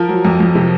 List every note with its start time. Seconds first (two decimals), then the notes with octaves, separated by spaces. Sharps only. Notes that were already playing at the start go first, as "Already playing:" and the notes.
Already playing: F3 A#4
0.09 F#3
0.25 F2
0.40 F2
0.55 C3